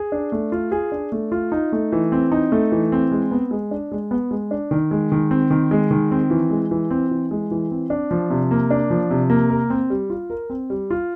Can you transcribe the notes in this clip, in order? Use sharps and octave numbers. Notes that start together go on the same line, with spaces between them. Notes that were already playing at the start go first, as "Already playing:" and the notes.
Already playing: G#4
D4
A3
F4
G#4
D4
A3
F4
D#4
A3
E3
C4
D#4
A3
E3
C4
G#3
B3
G#3
D4
G#3
B3
G#3
D4
D#3
G#3
D#3
C4
D#3
G#3
D#3
C4
E3
G#3
E3
C4
E3
G#3
E3
C4
D4
F3
C3
A#3
D4
F3
C3
A#3
A#4
C4
G3
F4
A#4
C4
G3
F4